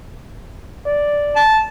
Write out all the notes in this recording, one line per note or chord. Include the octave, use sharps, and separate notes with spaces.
D5
A5